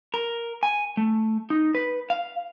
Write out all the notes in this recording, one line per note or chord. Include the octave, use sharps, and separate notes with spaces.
A#4
G#5
A3
D#4
B4
F5